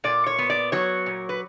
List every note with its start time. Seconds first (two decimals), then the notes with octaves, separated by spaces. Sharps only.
0.04 A#2 D5
0.26 C#5
0.38 B3
0.50 D5
0.72 F#3 C#5
1.06 A#2
1.29 B4